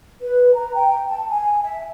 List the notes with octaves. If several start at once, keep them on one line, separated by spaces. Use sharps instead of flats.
B4
A#5
G5
A5
G#5
E5